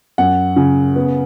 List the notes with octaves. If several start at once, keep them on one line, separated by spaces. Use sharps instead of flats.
F#2 F#5
C#3
B3